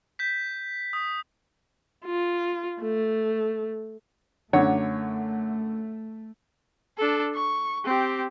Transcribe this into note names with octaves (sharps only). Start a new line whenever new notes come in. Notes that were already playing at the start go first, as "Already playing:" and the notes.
G6 B6
D#6
F4
A3
F#2 D3 A3 C#5
D4 A4
C#6
C4 G4